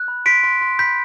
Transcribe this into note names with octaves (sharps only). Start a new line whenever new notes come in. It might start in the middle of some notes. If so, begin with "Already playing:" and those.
Already playing: F#6
B5
C6 B6 D7
C6
C6
B5 G6 B6